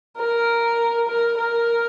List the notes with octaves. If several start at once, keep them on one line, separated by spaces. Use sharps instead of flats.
A#4
A#4
A#4